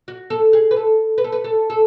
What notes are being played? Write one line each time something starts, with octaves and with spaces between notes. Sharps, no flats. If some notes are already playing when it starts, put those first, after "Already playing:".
F#4
A4
G#4
B4
A4
B4
A4
B4
A4
A4